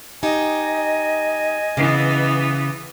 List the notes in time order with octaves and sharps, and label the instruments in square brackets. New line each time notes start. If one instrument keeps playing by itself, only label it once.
[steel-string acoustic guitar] D#4 G4 [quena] D#5 [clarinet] G#5
[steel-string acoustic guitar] C#3 [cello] E3 B3